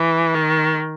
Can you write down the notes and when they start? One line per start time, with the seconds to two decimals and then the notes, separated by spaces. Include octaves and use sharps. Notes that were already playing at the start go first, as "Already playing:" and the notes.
Already playing: E3
0.34 D#3